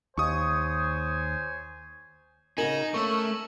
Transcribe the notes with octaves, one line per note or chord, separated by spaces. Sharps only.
D#2 C5 C#5 G#5 C#6 D#6
C#3 D#4 F#4 A#4 G#5 E7 F#7
A3 A#3 C#4 C#6 E6
A#4